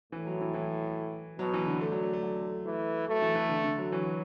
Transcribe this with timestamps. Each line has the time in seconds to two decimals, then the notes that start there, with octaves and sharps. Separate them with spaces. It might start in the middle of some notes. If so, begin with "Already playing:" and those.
0.12 A2 E3
0.27 F#3
0.41 E3
0.54 E3
1.39 B2 F#3
1.54 E3
1.66 D3
1.81 D3 A3
1.92 F#3
2.03 A3
2.13 A3
2.23 F#3
2.66 E3 A3
3.07 F#3 A3
3.22 E3
3.35 E3
3.49 D3
3.64 D3
3.78 F#3
3.92 E3 F#3